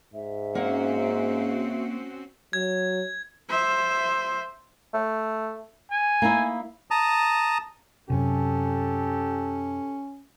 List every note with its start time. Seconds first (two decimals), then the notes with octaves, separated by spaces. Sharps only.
0.14 G#2 E5
0.55 A#3 C4 C#4 F#4 F5 F#5
2.53 F#3 G#6
3.49 C5 E5
4.94 A3
5.91 G#5
6.22 A#3 D#4 E4
6.91 A5 A#5 D#6
8.10 F#2 C3 C#4 G4 A4